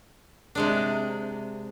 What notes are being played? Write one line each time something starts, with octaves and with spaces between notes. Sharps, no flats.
C3 G#3 D4